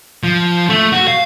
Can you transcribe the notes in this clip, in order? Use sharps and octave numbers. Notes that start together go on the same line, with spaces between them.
F3
A3
F#4
F5